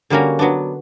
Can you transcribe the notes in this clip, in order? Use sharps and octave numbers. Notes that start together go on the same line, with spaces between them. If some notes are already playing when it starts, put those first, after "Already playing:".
D3 G3 A#3 C#4 F#4
F#3 B3 D4